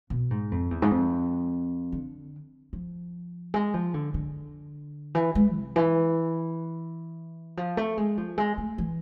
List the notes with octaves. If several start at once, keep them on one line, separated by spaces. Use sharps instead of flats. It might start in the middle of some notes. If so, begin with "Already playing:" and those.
B2
G#2
F2
E2
G#2
F2
D3
F3
G#3
F3
D3
D3
E3
G#3
C3
E3
F3
A3
G#3
F3
G#3
A3
E3